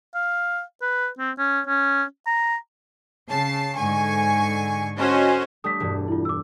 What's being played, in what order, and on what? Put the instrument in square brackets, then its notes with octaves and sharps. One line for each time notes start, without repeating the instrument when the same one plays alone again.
[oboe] F5
B4
C4
C#4
C#4
A#5
[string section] C#3 A5 C7
G#2 D3 G#5 C#6
C#4 F#4 A4 C5 C#5 D#5
[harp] G3 A3 D4 [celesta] D#6 B6
[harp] E1 G2
[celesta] E4 F4
D6 E6